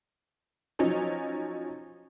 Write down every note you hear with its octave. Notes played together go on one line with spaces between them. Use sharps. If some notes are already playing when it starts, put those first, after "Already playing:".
F3 F#3 C#4 D#4